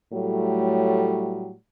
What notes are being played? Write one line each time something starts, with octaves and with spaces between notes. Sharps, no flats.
A2 F#3 G3 A3